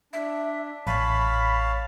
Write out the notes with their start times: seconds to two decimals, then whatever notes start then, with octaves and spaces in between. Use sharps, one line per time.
0.13 D4 E5
0.87 A1 C#5 F5 A5 B5